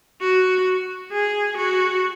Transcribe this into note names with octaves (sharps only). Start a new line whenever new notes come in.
F#4
G#4
F#4